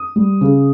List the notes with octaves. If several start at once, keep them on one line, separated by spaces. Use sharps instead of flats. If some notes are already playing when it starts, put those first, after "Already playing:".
Already playing: D#6
G3
C#3